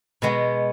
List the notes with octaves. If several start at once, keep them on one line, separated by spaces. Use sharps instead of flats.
B2 G#3 B3